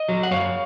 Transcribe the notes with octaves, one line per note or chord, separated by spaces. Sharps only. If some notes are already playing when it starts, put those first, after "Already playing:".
Already playing: D#5
F#3
F#5
F#2 C#5 F5